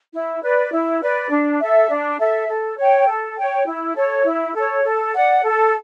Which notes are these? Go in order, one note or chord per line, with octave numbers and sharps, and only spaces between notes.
E4
B4 D5
E4
B4 D5
D4
A4 E5
D4
A4 E5
A4
C#5 G5
A4
C#5 G5
E4
A4 C#5
E4
A4 C#5
A4
D5 F#5
A4